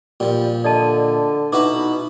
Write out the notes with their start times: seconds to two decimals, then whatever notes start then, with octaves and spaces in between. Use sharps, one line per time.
0.20 A#2 F3 G3
0.64 D3 D5 D#5 A5
1.52 B2 D#4 E4 F#4 B4 D6